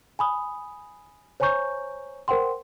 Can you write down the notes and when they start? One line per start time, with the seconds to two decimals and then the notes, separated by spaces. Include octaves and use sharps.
0.19 G#5 B5 D#6
1.40 C5 C#5 G#5 A#5 C#6 G6
2.28 A#4 C5 F#5 G5 C6